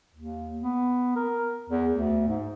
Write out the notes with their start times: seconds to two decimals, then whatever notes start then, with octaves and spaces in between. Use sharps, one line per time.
0.15 D#2
0.62 B3
1.16 A#4
1.70 E2
1.92 D2
2.28 G#2